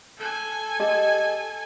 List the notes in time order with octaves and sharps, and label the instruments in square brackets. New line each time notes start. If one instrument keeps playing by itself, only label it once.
[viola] A4 G#5
[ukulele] G4 D#5